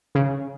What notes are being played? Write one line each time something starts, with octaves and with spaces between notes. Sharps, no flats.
C#3